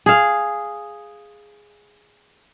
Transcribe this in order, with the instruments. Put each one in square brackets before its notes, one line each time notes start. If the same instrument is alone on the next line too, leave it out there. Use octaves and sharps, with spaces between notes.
[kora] G#4 F5